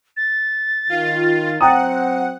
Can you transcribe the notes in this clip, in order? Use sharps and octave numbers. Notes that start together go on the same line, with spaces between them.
A6
D#3 F4
F#3 C4 F#5 G5 A#5 D#6